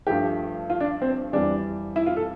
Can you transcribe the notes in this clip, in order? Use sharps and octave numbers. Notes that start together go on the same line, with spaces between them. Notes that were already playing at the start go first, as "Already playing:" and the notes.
G2 F3 A3 G4
F4
D4
C4
F2 E3 G3 D4
E4
F4
A4